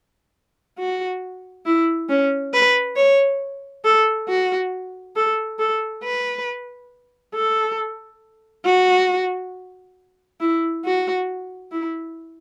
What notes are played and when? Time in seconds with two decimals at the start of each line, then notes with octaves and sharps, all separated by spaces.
0.78 F#4
1.66 E4
2.09 C#4
2.53 B4
2.96 C#5
3.84 A4
4.29 F#4
5.16 A4
5.59 A4
6.04 B4
7.35 A4
8.65 F#4
10.40 E4
10.85 F#4
11.72 E4